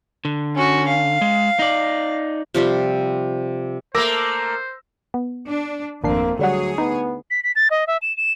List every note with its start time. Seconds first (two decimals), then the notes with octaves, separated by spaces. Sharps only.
0.25 D3
0.55 C#4 F#4
0.88 F5
1.21 G#3
1.59 D#4 D5
2.54 C3 F3 G3
3.95 A3 A#3 A#4 C5 D6 E6 A#6
5.14 B3
5.46 D4
6.04 G#1 F2 A3 A#3 C4 D4 C7
6.39 D2 D3 F#3 G3 G#4 C#5 F#5
6.78 B3 D#4
7.31 B6
7.44 B6
7.56 A6
7.71 D#5
7.87 E5
8.02 E7
8.17 E7